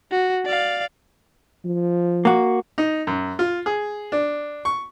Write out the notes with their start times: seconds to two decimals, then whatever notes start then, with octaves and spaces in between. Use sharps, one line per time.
0.11 F#4
0.45 D5 F5
1.65 F3
2.25 A#3 F#4
2.78 D#4
3.07 F#2
3.39 F4
3.66 G#4
4.12 D4
4.65 C#6